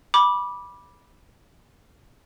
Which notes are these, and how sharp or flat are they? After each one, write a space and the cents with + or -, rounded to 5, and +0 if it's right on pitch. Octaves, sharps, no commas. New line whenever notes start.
B5 -15 D6 +0